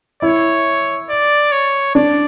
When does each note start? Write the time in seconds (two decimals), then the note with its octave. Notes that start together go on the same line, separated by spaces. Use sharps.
0.22 E4 C#5
1.10 D5
1.52 C#5
1.95 D4 D5